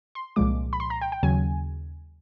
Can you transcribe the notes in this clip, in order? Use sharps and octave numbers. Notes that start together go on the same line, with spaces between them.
C6
C2 A#2 F3 G#3 D6
B5
C6
A#5
G5
G5
D#2 C#3 F#3 G#5